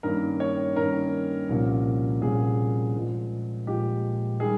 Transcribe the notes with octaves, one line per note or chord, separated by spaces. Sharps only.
G2 D#3 A#3 C#4 A#4
C#5
G2 D#3 A#3 C#4 A#4
C2 A#2 F3 A#3 C#4
C2 A#2 F3 A#3 C#4 G#4
A#2 F3 G#3
A#2 F3 G#3 G4
D#3 G3 G#4